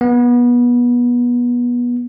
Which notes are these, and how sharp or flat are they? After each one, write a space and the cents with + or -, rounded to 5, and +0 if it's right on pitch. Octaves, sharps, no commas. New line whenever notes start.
B3 -25